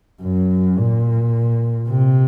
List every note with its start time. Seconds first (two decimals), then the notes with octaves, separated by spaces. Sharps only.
0.22 F#2
0.78 A#2
1.88 C3